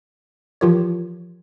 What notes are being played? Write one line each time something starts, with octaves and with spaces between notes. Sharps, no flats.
E3 F3 F4 G4 A#4 C#5